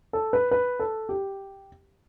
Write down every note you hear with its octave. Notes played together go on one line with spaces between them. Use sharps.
A4
B4
B4
A4
G4